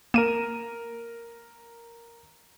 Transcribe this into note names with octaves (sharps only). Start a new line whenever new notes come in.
A#3 A#4 D#7 E7